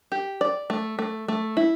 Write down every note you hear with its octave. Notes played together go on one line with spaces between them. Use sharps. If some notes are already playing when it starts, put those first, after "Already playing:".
G4
D5
A3
A3
A3
E4